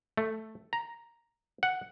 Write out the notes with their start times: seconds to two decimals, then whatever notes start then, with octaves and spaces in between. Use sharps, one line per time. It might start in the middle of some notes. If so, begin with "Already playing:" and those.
0.17 A3
0.73 A#5
1.63 F#5